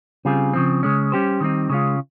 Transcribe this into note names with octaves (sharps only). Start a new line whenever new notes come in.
C#3 G3 C4 F4 G#4
C#3 F3 C4
C#3 G#3 C#4
G3 C#4 G4 C5
D#3 G3 C4 D#4
C#3 G#3 C#4 F4